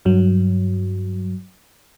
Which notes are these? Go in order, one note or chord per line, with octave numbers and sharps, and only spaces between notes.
G2 F#3